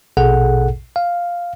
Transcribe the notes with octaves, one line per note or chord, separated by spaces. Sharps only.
A#1 B2 G#4 A4 F#5
F5